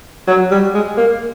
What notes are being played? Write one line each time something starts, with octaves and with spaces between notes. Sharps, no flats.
F#3
G3
G#3
A#3